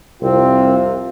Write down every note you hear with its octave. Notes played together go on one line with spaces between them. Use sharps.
C2 F2 C3 C4 F4